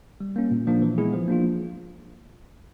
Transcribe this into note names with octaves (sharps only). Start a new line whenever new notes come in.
G3
A#3 C#4
A#2
F3 A#3 D4
E3
G#3 B3 E4 G#4
F3
A#3 D4 F4